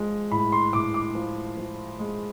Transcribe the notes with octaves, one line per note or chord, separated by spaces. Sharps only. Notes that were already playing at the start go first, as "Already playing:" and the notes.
Already playing: F3 G#3
A2 B5
C6
A2 D6
D6
F3
F3
G#3